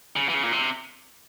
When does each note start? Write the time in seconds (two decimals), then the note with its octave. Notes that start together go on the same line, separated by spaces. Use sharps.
0.16 C#3
0.29 E3
0.34 C#3
0.43 A#2
0.52 C3